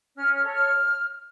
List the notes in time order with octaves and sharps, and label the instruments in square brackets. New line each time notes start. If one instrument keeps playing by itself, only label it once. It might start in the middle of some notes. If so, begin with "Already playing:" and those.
[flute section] C#4 F6
F6
A4 C#5
F6